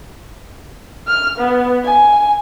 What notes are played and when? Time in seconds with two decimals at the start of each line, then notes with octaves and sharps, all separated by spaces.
1.07 F6
1.38 B3
1.85 G#5